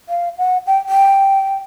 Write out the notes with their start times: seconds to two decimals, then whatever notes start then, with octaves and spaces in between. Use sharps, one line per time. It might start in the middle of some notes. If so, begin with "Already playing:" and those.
0.09 F5
0.38 F#5
0.67 G5
0.89 G5